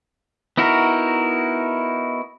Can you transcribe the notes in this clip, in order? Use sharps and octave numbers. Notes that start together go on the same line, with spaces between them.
B3 D#4 E4 F#4 A#4